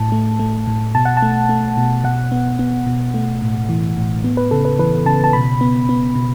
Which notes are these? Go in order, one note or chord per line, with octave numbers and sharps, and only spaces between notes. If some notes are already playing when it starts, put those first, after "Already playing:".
Already playing: A2 A5
A3
A3
A2
B2 A5
F#5
A5
A3
A3
B2
B2 F#5
B3
B3
B2
A3
A2
E3
A2
B3
B4
C#3 A4
B4
E3 B4
C#3 A5
A5
B2 B5
B3
B3
B2